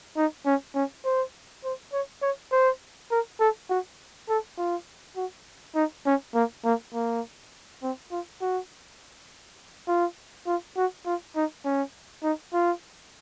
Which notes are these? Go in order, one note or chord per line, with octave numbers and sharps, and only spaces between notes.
D#4
C#4
C#4
C5
C5
C#5
C#5
C5
A#4
A4
F#4
A4
F4
F#4
D#4
C#4
A#3
A#3
A#3
C4
F4
F#4
F4
F4
F#4
F4
D#4
C#4
D#4
F4